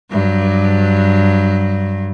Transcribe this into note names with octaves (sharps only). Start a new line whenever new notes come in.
G2 F#3